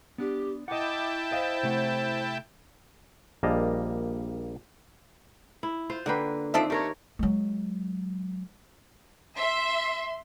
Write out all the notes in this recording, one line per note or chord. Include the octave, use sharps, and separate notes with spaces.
B3 D4 G4
E4 D#5 F#5 G5 A5 D6
C5 D#5 F5
C3 A3 F#5
A#1 G3 A#3 D#5 A5 A#5
E4
F4 C5
D3 A#3 B4 F#5 G5
D#3 F3 C4 D4 A4 E5
A3 G4 A#4 C#5
F#3 G#3
E5 C6